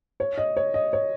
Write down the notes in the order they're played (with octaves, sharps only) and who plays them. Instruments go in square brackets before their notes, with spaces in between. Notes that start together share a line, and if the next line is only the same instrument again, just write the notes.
[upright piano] C#5
D#5
C#5
D#5
C#5